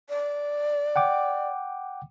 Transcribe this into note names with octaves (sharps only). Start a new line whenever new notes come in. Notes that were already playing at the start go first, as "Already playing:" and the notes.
D5
F#5 G5 D6